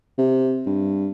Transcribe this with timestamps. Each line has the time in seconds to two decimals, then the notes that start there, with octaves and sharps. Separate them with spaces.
0.18 C3
0.66 G2